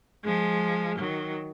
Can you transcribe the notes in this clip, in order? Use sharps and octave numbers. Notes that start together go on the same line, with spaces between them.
F3 G#3
D#3 F#3